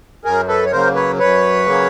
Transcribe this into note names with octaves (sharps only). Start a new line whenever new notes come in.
F#2 G#4 A#4
A4 B4
C#5
C#3 F#3 A#3 A#4 C5
B4 C#5
F#2 B4 C#5
C#3 F#3 A#3